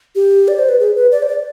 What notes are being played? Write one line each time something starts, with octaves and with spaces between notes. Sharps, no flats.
G4
D5
C5
B4
G#4
B4
D5
C5
D5